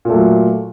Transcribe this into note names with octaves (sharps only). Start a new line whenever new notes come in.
A#2 F#3 A3